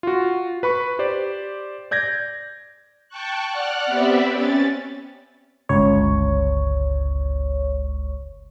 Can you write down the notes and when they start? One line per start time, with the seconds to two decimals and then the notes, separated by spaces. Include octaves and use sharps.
0.03 F4 F#4
0.63 B4 B5 C#6
0.99 G4 C5 D5
1.91 D5 G6 G#6 A#6
3.08 G5 A5 C#6 F#6
3.50 D5 F#5 F6 F#6
3.86 B3 C4 G4 B4 D5 E5
4.30 C#4 A6
5.69 G1 C#2 C#5